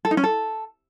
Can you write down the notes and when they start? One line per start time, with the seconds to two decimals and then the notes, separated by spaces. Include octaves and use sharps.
0.05 A4
0.11 D#4
0.17 C#4
0.24 A4